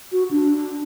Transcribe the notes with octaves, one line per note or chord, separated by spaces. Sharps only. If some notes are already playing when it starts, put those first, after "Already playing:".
F#4
D4